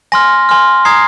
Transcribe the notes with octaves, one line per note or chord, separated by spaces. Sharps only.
G#5 C6 F6 A#6
G#5 C6 F6
A#5 D#6 G#6 C7